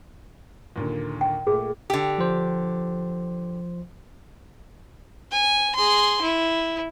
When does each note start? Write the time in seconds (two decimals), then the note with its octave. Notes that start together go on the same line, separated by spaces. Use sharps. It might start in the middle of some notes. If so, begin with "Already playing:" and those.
0.76 D#2 A#2 D3
1.21 G5
1.47 A#2 A3 G#4
1.90 D3 G4
2.18 F3 C5
5.32 G#5
5.76 G#4 C6
6.22 E4